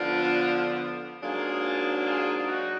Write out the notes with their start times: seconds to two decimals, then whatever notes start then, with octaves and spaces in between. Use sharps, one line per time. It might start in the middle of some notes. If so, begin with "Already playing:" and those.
Already playing: D3 F3 B3 D4 F4
1.22 G#2 F#3 A#3 D4 F4 G#4
2.06 F4 G#4
2.47 D#4 F#4